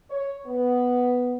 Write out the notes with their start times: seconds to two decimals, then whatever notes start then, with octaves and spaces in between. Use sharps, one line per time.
0.11 C#5
0.47 B3